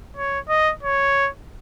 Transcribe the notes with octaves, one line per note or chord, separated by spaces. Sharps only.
C#5
D#5
C#5